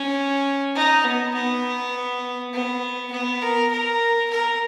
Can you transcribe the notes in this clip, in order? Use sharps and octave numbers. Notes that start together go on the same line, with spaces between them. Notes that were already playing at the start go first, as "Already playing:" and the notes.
Already playing: C#4
D#4
B3
B3
B3
B3
A#4
A#4
A#4